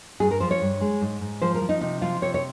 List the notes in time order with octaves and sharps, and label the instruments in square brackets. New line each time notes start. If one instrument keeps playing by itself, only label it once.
[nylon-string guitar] G2 G#4
A#4
F3 C5
C#5
G2
G#3
G#2
G#2
F3 C5
A#4
F3
D#4
C3 D#4
F3 F4
C3 C#5
C#5